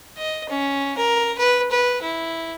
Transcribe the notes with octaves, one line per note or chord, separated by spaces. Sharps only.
D#5
C#4
A#4
B4
B4
E4